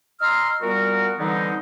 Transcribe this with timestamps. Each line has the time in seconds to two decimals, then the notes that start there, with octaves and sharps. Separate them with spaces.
0.21 D#5 A#5 C6 E6 F6
0.62 A#2 G3 B3 F#4 A#4
1.19 D3 E3 G3 B3 C4 D#4